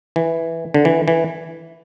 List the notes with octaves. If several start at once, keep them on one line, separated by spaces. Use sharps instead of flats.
E3
D3
E3
E3